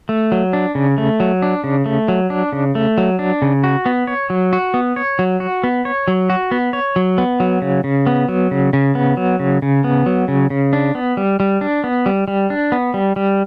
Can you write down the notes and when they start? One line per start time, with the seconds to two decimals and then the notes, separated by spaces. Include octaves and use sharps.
0.09 A3
0.32 F#3
0.53 D4
0.75 C#3
0.98 A3
1.20 F#3
1.42 D4
1.64 C#3
1.86 A3
2.08 F#3
2.30 D4
2.53 C#3
2.75 A3
2.98 F#3
3.19 D4
3.42 C#3
3.64 F#4
3.86 B3
4.07 C#5
4.30 F#3
4.53 F#4
4.74 B3
4.96 C#5
5.19 F#3
5.40 F#4
5.64 B3
5.85 C#5
6.08 F#3
6.30 F#4
6.51 B3
6.73 C#5
6.96 F#3
7.18 B3
7.40 F#3
7.62 C#3
7.84 C#3
8.07 B3
8.29 F#3
8.51 C#3
8.73 C#3
8.95 B3
9.17 F#3
9.39 C#3
9.62 C#3
9.84 B3
10.06 F#3
10.28 C#3
10.50 C#3
10.73 D4
10.95 B3
11.17 G3
11.40 G3
11.61 D4
11.84 B3
12.06 G3
12.28 G3
12.50 D4
12.72 B3
12.94 G3
13.16 G3